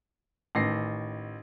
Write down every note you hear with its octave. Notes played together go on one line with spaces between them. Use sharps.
A1 D#3 A#6 C7